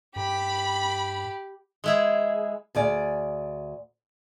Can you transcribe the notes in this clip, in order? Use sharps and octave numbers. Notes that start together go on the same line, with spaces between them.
G2 G4 B5
G#3 E4 G#4
D2 G#4 D5